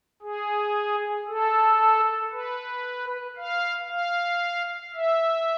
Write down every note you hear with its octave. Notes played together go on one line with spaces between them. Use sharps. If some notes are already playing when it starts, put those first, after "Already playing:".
G#4
A4
B4
F5
F5
E5